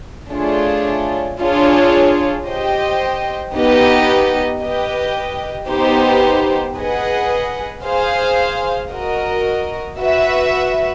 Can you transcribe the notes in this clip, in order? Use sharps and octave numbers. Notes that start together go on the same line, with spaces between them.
A3 D4 F4 G#4 C#5
D4 F4 G#4 C#5
G4 C5 D#5 G5
B3 D#4 G4 B4 D#5
G4 B4 D#5 G5
B3 D#4 G4 C5
G#4 B4 D#5 F#5
G#4 C5 F5
F#4 A#4 D#5
F#4 B4 E5